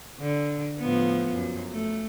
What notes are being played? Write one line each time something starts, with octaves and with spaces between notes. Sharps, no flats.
D3
A2 F3 B3
F#2
A3